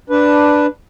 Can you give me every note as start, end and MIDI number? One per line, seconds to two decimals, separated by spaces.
0.10 0.66 62
0.10 0.66 71